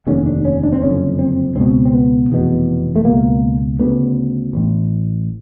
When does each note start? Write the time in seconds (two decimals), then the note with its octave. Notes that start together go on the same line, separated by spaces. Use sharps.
0.07 F1 D#2 D3 C#4
0.26 D4
0.45 C#4
0.63 D4
0.72 C4
0.81 F#1 F2 D3 C#4
1.19 C4
1.56 C#2 B2 C4
1.85 C4
1.93 B3
2.30 F1 E2 B2
2.96 A3
3.05 C#2 B2 A#3
3.79 D2 C#3 B3
4.53 A1 A2